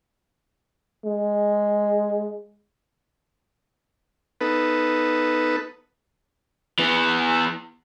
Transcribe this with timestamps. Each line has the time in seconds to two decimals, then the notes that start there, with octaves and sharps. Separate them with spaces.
1.04 G#3
4.41 B3 D#4 A4 B4
6.79 E3 B3